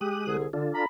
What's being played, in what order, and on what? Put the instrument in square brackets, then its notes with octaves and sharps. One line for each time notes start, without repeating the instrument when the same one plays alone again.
[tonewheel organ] G#3 D#6 F#6 [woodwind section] G4
[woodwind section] C2 D3 G#4
[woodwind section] D3 [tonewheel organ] D4 F4 A4
[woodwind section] A#5 B5